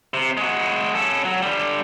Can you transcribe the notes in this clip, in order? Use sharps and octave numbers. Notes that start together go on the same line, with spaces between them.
C3
G#3 F#4
C#4 A4
F#3
D3 G3